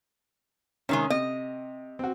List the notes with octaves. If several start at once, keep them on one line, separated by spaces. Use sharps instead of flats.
C3 D#3 G#3 C#4
C3 D#5
C4 F#4